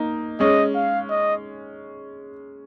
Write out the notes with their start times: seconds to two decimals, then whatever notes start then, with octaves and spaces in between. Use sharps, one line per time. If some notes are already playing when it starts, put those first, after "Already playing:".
Already playing: A#3 D#4
0.40 G#3 C#4 D#5
0.75 F5
1.10 D#5